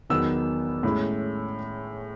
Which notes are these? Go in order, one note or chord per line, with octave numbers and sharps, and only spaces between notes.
E2 D#3 F#3 B3 E6
A2 G#3 C#4 E4